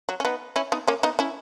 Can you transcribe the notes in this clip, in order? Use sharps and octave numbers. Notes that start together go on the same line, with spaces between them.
F#3
C#4
B3 D#4
C#4 E4
B3 D#4
A#3 C#4
B3 D#4
C#4 E4